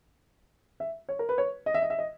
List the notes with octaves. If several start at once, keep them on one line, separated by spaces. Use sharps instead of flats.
E5
C#5
A#4
B4
C#5
D#5
E5
D#5
E5
D#5